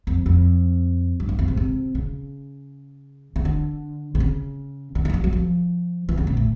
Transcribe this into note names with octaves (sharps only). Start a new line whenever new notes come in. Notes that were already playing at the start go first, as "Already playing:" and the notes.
F2
F2
G2
F#2
F2
G#2
C3
C#3
C#3
D3
C3
C#3
D3
D#3
E3
F3
F#3
F3
E3
C#3
B2
A2